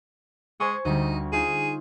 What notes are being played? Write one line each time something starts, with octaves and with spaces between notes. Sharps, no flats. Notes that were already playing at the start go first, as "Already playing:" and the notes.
G#3 C5 G#5 C#6
D2 G3 D#4
D#4 F4 G#4 C6